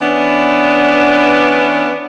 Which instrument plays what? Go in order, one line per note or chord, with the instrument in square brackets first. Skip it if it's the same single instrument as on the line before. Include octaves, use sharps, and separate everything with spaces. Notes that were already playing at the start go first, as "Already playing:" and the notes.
[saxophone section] E3 B3 C#4 D4